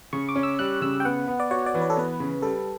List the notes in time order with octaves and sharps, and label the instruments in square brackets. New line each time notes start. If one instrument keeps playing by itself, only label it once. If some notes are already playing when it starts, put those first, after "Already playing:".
[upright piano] C#3 [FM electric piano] C#6
[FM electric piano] D6
[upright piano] C#4
[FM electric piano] E6
[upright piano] G3 [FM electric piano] F#6
[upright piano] C#3 [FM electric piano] E6
[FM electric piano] G5
[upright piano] B3 [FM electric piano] F#5
[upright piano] B3
[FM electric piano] D5
[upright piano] F#4 [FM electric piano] C#5
[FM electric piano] D5
[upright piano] E3
[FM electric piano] B4
A4
[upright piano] B3 [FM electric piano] B4
[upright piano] C#3
[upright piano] G3 [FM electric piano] A4